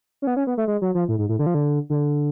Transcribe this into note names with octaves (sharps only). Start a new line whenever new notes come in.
C#4
B3
C#4
B3
A3
G#3
F#3
F3
A2
G#2
A2
D3
F3
D3
D3